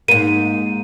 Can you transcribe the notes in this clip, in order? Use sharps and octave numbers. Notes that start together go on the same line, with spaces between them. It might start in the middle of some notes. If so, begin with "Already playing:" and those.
G#2 A#3 D#7